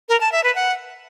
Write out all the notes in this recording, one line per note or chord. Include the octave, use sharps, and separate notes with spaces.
A#4
A5
E5
B4
F#5